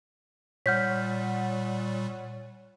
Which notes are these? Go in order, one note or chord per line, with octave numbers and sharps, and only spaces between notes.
A#2 G3 C#5 F#5 F6 G6 B6